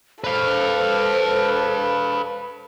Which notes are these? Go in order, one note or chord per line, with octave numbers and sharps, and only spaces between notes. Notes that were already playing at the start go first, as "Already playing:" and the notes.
A4 B4 C5 F5